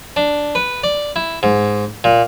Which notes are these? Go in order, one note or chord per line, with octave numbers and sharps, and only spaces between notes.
D4
B4
D5
E4
G#2
A#2